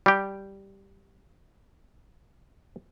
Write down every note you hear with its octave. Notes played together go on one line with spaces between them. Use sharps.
G3 G4